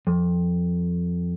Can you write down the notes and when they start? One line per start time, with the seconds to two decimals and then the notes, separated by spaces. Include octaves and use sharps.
0.07 F2